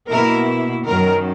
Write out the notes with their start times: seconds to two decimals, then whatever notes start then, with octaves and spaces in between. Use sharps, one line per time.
0.10 B2 A#3 E4 A#4
0.86 F#2 D#3 F#3 A#4